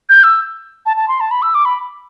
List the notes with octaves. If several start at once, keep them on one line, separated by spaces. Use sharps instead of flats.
G6
E6
A5
A5
C6
A5
B5
E6
D6
B5